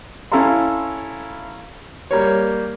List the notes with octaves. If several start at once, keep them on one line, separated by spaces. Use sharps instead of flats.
C#4 E4 A4 F5 A#5 C6
G3 A#3 C#5